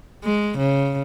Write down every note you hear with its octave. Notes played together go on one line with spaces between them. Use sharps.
G#3
C#3